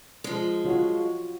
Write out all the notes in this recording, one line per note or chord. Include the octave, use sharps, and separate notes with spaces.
F3 G#3
F4 F#4 C#5